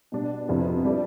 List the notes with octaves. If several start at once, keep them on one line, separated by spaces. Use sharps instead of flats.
B2 G3 D4
F2 C3 F3 B3 E4
G3 D4 A4 D5